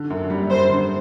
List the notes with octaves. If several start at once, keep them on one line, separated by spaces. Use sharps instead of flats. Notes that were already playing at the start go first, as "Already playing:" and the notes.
Already playing: D3
F#2
G3
F#2 C5
D3